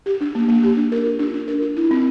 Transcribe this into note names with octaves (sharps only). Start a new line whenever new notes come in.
G4
D4
A#3
A#3
G4
D4
A#4
F4
D4
D4
A#4
F4
E4
C4